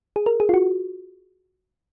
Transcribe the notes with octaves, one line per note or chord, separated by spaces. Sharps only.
G#4
A#4
G#4
F4
F#4